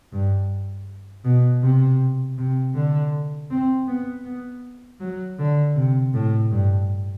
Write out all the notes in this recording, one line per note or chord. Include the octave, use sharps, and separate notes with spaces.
G2
B2
C3
C3
D3
C4
B3
B3
F#3
D3
C3
A2
G2